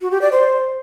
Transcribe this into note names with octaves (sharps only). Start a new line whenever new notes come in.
F#4
G4
D5
C5